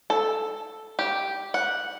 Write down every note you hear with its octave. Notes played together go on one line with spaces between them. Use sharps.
A4
G4
F#5